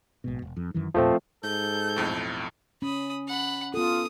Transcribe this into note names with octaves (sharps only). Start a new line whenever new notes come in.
A#1 G#2 B2
E1
F2
F#2 D#3 E3
E2 A#2 F3 A3 C4
G#2 A4 G6
B1 F2 A2
C#4 B5 D#6
F#5 B5
B3 F4 A4 D#6